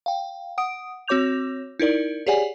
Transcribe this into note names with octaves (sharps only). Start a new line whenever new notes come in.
F5 G5
F#5 D#6 D7
C4 F#4 C#5 D6 G6 F7
D#4 E4 A#4 D5
G4 G#4 C#5 D5 F#5 G#5